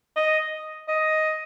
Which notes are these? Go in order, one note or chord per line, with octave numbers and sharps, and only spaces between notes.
D#5
D#5